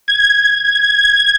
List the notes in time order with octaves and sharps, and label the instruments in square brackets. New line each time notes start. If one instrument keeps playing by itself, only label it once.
[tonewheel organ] G#6